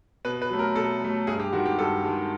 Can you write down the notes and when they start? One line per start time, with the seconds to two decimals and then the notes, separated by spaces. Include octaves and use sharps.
0.25 B2 B4
0.42 B4
0.50 F#3 A3
0.59 A#4
0.76 B2 A4
1.02 F#3 A3
1.27 G2 G#4
1.39 G4
1.53 D#3 G#3 F#4
1.66 G4
1.78 G2 A4
2.03 D#3 G#3